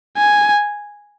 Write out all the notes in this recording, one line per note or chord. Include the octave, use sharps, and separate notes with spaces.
G#5